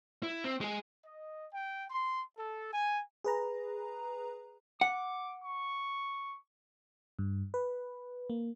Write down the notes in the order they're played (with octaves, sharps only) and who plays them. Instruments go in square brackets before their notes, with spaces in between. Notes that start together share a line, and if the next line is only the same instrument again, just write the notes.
[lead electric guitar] E4
C4
G#3 G#4
[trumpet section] D#5
G5
C6
A4
G#5
[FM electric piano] G#4 B4 A#5
[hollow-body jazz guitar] F#5 [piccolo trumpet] D6
[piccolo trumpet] C#6
[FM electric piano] G2
B4
A#3